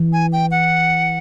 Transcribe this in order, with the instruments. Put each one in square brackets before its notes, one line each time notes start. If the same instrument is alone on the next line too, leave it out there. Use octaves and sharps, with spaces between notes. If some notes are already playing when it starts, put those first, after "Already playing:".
Already playing: [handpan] E3
[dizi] G#5
G5
F#5